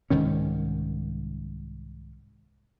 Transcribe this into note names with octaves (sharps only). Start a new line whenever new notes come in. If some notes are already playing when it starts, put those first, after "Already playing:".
C2 G#2 D#3 C#4